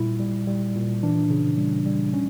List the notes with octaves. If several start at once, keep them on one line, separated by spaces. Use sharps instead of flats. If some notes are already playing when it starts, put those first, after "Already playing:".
Already playing: A#2 G3 E4
G3
G3
A#2
E3 D4
C#3
G3
G3
C#4